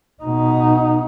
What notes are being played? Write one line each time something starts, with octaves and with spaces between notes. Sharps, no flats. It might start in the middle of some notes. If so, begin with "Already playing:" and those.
B2 D#4